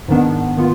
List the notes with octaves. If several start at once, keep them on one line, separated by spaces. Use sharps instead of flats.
G#2 D#3 B3 D4
D#3 B3 F4